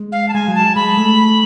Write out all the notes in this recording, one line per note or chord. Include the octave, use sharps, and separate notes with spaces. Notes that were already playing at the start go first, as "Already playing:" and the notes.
Already playing: G#3
F5
A5
G#3 G#5
F#3
A5
G#3 B5
A3